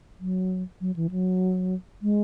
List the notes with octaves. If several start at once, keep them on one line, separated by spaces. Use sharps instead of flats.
F#3
F#3
E3
F#3
G#3